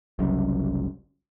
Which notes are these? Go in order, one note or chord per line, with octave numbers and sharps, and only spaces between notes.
F#1 C2 F#2